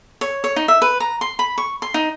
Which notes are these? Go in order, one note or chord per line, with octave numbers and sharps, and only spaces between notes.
C#5
C#5
D#4
E5
B4
A#5
C6
B5
C#6
C6
D#4